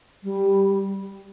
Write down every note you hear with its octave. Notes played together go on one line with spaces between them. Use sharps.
G3